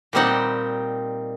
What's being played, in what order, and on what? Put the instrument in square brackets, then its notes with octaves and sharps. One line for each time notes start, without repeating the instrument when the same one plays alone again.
[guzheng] A#2 G3 C4 D#4 F#5